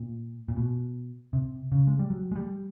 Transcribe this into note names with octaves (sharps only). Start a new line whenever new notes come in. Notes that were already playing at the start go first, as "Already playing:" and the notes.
Already playing: A#2
A#2
B2
C3
C#3
G#3
G3
F#3
G#3
G3